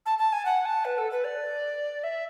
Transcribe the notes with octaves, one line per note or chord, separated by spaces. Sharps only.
A5
A5
G#5
F#5
A5
B4
A4
B4
D5
E5